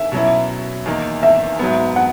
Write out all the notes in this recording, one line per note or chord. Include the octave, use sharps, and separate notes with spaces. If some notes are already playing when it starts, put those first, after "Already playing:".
Already playing: E5
B2 F#3 C#4 E4
E2 D#3 A#3 D#4
E5
G#2 F#3 B3
F#5